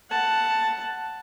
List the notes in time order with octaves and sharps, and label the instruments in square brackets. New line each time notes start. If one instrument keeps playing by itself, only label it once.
[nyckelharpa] F#5 A5